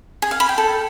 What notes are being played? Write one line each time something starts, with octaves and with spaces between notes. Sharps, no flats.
G#4
F5
B5
G5
A4